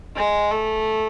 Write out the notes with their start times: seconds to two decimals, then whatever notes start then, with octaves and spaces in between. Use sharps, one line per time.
0.16 G#3
0.51 A3